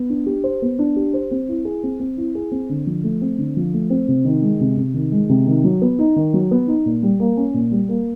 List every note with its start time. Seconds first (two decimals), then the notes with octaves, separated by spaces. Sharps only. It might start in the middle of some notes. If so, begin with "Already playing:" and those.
Already playing: B3
0.10 D4
0.26 G4
0.44 C5
0.62 B3
0.79 D4
0.96 G4
1.14 C5
1.31 C4
1.48 E4
1.65 G#4
1.83 C4
2.00 C4
2.17 E4
2.35 G#4
2.52 C4
2.69 D3
2.87 F3
3.04 A3
3.22 C4
3.38 D3
3.57 F3
3.74 A3
3.90 C4
4.08 C3
4.25 D#3
4.42 G#3
4.61 C3
4.77 C3
4.94 D#3
5.12 G#3
5.29 C3
5.46 D#3
5.64 F#3
5.82 B3
5.99 D#4
6.16 D#3
6.34 F#3
6.51 B3
6.67 D#4
6.86 A#2
7.03 G3
7.20 A#3
7.37 C#4
7.54 A#2
7.71 G3
7.89 A#3